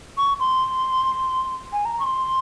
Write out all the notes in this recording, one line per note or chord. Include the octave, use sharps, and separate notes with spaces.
C#6
C6
G#5
A#5
C#6
C6